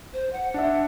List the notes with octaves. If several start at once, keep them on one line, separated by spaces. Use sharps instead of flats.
C5
F#5
D4 E5